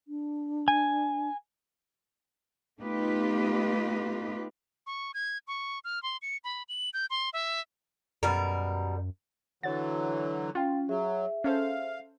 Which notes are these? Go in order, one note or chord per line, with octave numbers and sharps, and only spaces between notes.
D4
G#5
A3 B3 D#4 F4 G4 B4
C#6
G#6
C#6
F6
C6
C#7
B5
F#7
G6
C6
E5
F#2 B2 G3 A#4
D3 E3 F#3 C#5 F#5 A6
C#4 F4 F5 G5 A6
F#3 G#4 E5
C#4 A4 C5 F5